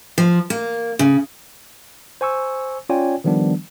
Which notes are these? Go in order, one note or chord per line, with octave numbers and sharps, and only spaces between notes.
F3
A#3
C#3
C5 G#5 C#6 E6
C#4 F4 C#5 D5 G5 G#5
D#3 F3 G3 B3 D4